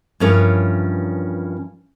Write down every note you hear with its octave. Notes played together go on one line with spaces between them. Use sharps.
G2 E3 F3 C#4 A#4 C#5